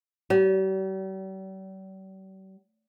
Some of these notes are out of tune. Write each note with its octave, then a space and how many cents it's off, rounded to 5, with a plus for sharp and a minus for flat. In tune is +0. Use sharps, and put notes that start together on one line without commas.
G3 -45